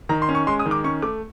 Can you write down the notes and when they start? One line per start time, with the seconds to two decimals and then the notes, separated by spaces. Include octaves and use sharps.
0.09 D#3 A#5
0.22 C6
0.29 C#4
0.35 C#6
0.47 G#3 C6
0.59 D#6
0.66 D#3
0.71 D6
0.84 C#4 C#6
1.02 A3 D6